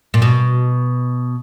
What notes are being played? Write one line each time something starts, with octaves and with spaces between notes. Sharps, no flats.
A#2
B2